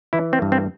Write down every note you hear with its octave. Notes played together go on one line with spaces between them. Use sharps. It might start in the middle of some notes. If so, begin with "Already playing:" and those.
E3 E4
C4
G2
C4